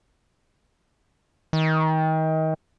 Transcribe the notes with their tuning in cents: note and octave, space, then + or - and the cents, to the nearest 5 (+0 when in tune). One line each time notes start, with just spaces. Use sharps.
D#3 +30